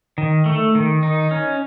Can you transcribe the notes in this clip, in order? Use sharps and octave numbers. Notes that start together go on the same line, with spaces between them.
D#3
A3
D#3
D#4
C#4